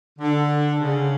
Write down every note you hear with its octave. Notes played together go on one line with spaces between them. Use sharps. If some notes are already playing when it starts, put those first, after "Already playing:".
D3
C#3